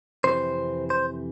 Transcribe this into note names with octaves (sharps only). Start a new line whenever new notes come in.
F2 C3 E3 C5
C5